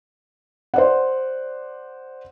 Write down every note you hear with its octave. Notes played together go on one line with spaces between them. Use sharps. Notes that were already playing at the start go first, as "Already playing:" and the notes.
C5 D5 F#5